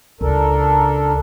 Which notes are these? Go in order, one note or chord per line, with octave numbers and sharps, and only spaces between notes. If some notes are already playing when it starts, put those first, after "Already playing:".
C#2 D4 A4 A#4